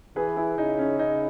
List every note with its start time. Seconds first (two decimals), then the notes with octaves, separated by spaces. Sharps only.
0.16 E3 G#4 B4
0.37 E4 G#4
0.58 C#3 D#4
0.78 C#4
0.99 C#3 D#4